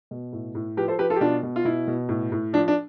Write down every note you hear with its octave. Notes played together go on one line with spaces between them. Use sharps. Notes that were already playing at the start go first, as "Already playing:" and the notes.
B2
A2
A2
F3 G4 B4
A4 C5
F3 G4 B4
F4 A4
G4
B2 D4 F4
B2
F4
B2 E4
B2
A2
A2
F3 D4
D4